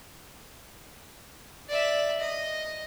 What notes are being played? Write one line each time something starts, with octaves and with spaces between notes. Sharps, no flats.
D5 E5
D#5